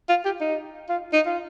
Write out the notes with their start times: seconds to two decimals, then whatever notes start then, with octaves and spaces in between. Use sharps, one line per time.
0.09 F4
0.25 G4
0.41 D#4
0.89 F4
1.13 D#4
1.26 F4